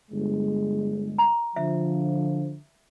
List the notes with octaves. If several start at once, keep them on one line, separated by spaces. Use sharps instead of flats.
G1 G#3
A#5
D3 F3 E5